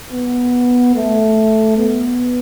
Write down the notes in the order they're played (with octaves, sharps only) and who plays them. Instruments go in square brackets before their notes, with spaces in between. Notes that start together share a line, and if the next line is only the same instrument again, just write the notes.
[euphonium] B3
A3
B3